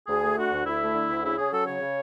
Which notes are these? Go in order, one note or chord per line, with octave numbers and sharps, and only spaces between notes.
D2 G#4
A3
D3 F#4
D2
D2 E4
A3
D3
D2
C#3 E4
C#4 G#4
F#3 A4
C#3 C#5
C#3